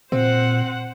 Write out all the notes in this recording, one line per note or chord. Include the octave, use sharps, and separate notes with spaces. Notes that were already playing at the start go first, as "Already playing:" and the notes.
A#2 C4 C5 F#5